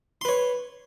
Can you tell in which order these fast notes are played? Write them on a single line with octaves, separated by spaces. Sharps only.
C6 B4 C#5